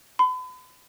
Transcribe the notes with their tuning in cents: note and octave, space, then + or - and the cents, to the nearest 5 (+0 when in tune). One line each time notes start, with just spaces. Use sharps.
B5 +40